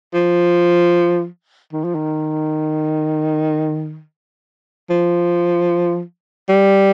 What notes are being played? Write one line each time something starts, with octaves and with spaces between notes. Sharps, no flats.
F3
D#3
F3
D#3
F3
G3